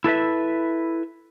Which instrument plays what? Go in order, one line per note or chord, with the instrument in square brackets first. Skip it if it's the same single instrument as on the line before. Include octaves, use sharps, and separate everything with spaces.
[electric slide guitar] E4 A4 B4 E5